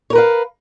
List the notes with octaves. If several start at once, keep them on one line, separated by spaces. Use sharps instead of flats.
A#4 B4 C#5 F5